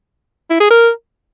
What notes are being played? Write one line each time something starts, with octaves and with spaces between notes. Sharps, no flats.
E4
G#4
A#4